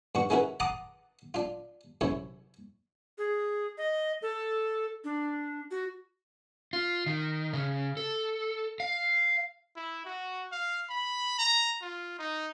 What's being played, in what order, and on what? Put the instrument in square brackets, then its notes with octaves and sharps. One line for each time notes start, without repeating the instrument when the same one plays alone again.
[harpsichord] G2 F#4 C#6
G#3 C#4 E4 F#4 A#4 B4
F#5 A5 A#5 C6 D6 D#6
D4 F4
F#2 C3 E4 C#5
[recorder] G#4
D#5
A4
D4
F#4
[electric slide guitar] F4
D#3
C#3
A4
F5
[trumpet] E4
F#4
F5
B5
A#5
F4
D#4